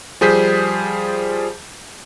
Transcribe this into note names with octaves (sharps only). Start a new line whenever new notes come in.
F3 G3 G#4 C5 G6 B6